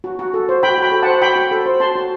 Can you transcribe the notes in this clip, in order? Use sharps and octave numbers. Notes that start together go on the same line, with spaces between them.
F#4
F#4
A4
C5
F#4 G5 B5
F#4 G5 B5
A4
C5 F#5 A5
F#4 G5 B5
F#4
A4
C5
F#4 A5 C6
F#4